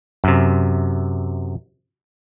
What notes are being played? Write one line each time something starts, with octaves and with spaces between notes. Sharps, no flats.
F#2 C3